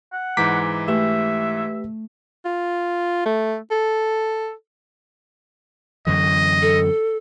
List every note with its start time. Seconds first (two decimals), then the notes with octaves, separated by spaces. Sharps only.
0.13 F#5
0.37 G#2 E3 G#3 A#5 D6 G6 B6
0.88 A3 G4 B4 E5
2.45 F4
3.26 A3
3.71 A4
6.07 F#2 D3 E3 D#5
6.62 A4